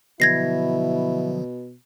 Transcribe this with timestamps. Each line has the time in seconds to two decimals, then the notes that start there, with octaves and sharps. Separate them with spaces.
0.20 B2 D3 F3 F#3 E4 G#6 A#6 C7